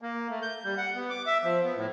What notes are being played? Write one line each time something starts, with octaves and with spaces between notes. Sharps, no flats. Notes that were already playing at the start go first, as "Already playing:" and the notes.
A#3
A3
G6
G3
F#5
B3
D6
E5
F3
B3
A2